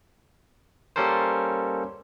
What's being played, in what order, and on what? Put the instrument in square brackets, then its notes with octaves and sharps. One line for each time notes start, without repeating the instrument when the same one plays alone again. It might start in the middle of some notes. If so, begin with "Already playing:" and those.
[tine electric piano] G3 A#3 C#4 A4 A#4 C5